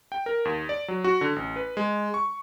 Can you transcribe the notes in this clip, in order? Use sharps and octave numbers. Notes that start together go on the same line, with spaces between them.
G5
A#4
D#2
D5
F#3
F#4
D3
A1
B4
G#3
C#6